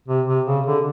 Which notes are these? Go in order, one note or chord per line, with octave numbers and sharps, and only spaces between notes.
C3
C3
C#3
D3